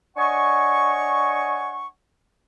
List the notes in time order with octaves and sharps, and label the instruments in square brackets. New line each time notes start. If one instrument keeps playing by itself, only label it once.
[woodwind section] D4 C#5 D#5 F#5 G#5 C#6